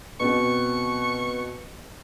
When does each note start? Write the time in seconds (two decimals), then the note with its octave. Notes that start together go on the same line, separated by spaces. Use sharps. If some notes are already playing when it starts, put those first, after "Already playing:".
0.20 B2 C4 C#6